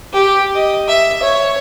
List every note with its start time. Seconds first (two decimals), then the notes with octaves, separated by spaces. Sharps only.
0.13 G4
0.55 D#5
0.88 E5
1.23 C#5